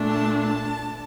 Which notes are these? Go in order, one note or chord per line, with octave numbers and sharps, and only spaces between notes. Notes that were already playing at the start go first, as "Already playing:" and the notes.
Already playing: A#2 A3 D4
A5
A5